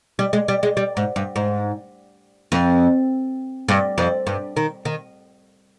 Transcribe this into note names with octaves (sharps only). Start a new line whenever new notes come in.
G3
G#3
G3
G#3
G3
G#2
G2
G#2
F2
G2
F2
G2
D#3
D#3